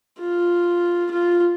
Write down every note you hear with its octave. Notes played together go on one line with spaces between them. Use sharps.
F4
F4